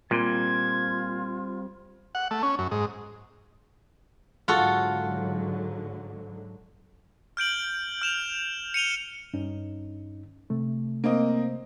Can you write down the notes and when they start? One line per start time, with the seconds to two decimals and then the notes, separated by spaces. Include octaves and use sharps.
0.11 A#2 G3 C4 F4 C6 G#6
2.15 F#5
2.31 A3
2.43 C#4
2.59 F#2
2.71 G#2
4.48 G#2 D3 F#3 F4 F#4 A4
7.37 F6 G6 D7 F#7
8.02 F6 E7 F7
8.74 C#7 D#7 F7 G7
9.33 G2 C#4 D#4
10.50 C3 A3
11.04 A#3 C4 D#5